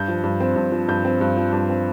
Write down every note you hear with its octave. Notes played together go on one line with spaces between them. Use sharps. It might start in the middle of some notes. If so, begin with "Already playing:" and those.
Already playing: G2 G6
F3
G2
C4
G2
F3
G2 G6
C4
G2
F3
G2
C4